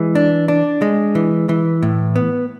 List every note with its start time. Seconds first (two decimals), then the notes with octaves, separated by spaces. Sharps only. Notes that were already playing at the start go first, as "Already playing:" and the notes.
Already playing: E3 G#3
0.15 D4
0.48 D4
0.82 G#3
1.15 E3
1.49 E3
1.82 A2
2.16 B3